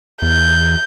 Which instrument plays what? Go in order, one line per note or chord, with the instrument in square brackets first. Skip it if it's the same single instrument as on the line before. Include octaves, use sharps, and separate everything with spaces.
[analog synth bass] E2 [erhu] G6